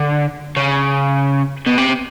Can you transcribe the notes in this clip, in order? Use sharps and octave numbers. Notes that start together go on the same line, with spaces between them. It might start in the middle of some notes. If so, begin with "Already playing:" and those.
Already playing: D3
C#3
B2
C3